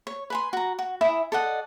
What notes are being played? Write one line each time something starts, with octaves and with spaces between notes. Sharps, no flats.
C#5
B4 G#5 C6
F#4 A#5
F#4
E4 E5 G#5 D#6
A4 D5 D#5 F#5